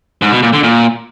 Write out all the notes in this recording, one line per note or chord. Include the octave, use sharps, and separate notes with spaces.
G#2
B2
A#2
D3
A#2